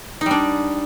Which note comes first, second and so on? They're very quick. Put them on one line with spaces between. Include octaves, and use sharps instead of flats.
D#4 G3 D4